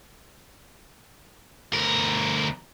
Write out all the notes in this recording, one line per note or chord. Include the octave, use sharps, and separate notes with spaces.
D2 A#4